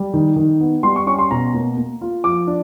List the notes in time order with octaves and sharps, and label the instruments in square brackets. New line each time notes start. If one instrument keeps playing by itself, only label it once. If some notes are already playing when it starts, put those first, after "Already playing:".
Already playing: [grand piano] G3
D#3
D#3
B3
G3 C6
C#6
C#4 C#6
C6
B2 A#5
A#3
A#3
F4
F3 D6
D4